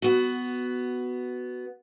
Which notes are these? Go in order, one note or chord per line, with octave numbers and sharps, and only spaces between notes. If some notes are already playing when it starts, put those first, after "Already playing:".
B3 F#4